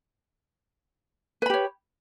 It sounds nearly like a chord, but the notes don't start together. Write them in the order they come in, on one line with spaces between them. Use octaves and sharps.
B4 B5 G4 C#5